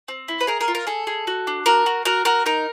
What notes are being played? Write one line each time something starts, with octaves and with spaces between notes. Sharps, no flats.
C4
E4
B4
G#4 A#4
A#4
F4
A#4
G#4 A4
G#4
F#4
D4
F#4 A#4
F#4
F#4 A#4
F#4 A#4
D#4 A#4